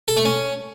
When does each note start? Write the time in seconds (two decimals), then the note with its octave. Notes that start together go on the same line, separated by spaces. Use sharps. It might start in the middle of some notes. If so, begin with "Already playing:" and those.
0.08 A4
0.17 A3
0.25 C#4